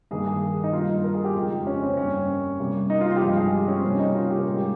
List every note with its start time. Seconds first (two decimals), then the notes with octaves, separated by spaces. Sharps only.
0.11 G2 D#3 A#3 G#4
0.26 G#4
0.63 D#4
0.73 G2 G3 A#3 F4
0.89 D#4
1.04 A#4
1.14 G#4
1.25 G4
1.35 F2 C#3 G#3 F4
1.51 D#4
1.67 C#4
1.82 C4
1.97 G2 G3 A#3 C#4
2.60 C3 G3 A#3
2.90 D#4
3.01 F4
3.11 F4
3.16 G4
3.21 G2 F3 G#3 F4
3.36 G#4
3.53 G4
3.68 C#4
3.79 C4
3.84 C3 G3 A#3 C#4
3.99 D#4
4.15 F4
4.30 G4
4.38 A#4
4.45 G#2 G3 A#3 G#4
4.56 G4